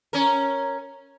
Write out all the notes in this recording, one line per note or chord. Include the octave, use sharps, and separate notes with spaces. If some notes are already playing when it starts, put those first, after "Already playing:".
C#4 A#4